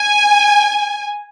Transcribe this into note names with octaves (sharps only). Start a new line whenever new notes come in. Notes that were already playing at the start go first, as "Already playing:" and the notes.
Already playing: G#5